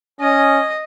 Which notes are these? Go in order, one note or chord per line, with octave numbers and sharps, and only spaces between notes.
C#4 D#5